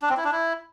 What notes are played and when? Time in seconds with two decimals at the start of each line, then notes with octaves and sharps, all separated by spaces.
0.02 D4
0.10 C4
0.17 E4
0.24 D4
0.32 E4